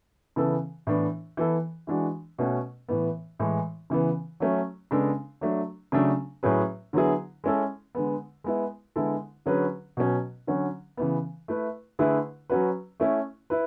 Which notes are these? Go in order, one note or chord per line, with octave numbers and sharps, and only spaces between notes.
C#3 E3 B3 E4 A4
A2 E3 B3 D4
E3 B3 E4 A4
E3 G#3 D4 F#4
B2 A3 C#4 F#4
A2 E3 B3
A2 E3 G#3
C#3 E3 B3
F#3 A3 C#4
C#3 G#3 B3 D4 A4
F#3 A3 D4
C#3 F#3 A3 D4 A4
A2 F#3 C#4 G#4 B4
D3 F#3 B3 E4 G#4
G#3 C#4 E4 A4
D3 G#3 B3
G#3 B3 E4
D3 G#3 B3 E4 A4
D3 F#3 C#4 G#4 B4
B2 F#3 C#4
D3 F#3 C#4 F#4
C#3 E3 B3
A3 E4 B4
D3 A3 E4 G#4 B4
F#3 C#4 F#4 B4
A3 C#4 E4
E4 B4